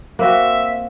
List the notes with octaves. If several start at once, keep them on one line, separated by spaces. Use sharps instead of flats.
A#3 C4 F#4 E5